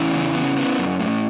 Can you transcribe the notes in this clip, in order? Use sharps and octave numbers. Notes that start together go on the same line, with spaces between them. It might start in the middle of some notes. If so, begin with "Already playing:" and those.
Already playing: E2 C#4 E4
C#3
B3
B3
F#2
A2